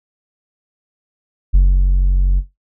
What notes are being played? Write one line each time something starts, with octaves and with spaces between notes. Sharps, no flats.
F#1